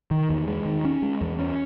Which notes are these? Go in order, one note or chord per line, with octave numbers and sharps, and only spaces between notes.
D#3
E2
G#3
D#3
C#4
G#3
E2
C#4